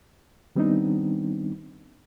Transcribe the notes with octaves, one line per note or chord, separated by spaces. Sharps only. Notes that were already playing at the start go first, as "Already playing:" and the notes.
D#3 G3 B3 C4 D4 D#4